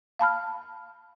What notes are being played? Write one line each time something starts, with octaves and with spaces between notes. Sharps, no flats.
F5 A5 B5 F6